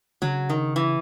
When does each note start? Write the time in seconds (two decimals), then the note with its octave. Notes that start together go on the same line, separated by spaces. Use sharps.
0.22 C#3 F#3
0.50 D#3
0.76 E3